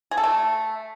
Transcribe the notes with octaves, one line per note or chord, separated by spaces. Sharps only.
G#4
A4
A3